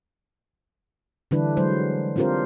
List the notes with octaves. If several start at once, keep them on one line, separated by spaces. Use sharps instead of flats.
D3 E3 G3 D4 E4 B4
F#3 G#3 C5
C4 D4 F4 G4 A#4 C5